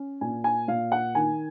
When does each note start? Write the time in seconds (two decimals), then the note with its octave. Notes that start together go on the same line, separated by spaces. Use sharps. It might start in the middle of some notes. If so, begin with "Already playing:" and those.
Already playing: C#4
0.21 A#2 G#5
0.44 G#5
0.68 A#2 F5
0.92 F#5
1.15 D#3 G#5